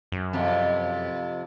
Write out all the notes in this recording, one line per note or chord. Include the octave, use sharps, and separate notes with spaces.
F#2
F2 C3